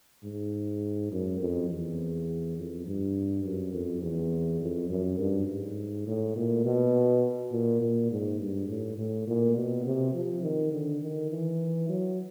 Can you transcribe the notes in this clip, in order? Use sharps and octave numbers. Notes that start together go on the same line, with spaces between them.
G#2
F#2
F2
E2
F2
G2
F#2
F2
E2
F2
F#2
G2
G#2
A2
A#2
B2
A#2
A#2
G#2
G2
A2
A2
A#2
B2
C3
F3
D#3
D3
D#3
E3
F#3